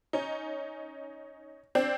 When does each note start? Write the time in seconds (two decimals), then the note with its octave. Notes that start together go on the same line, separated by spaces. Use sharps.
0.13 C#4 D#4
1.75 C4 D4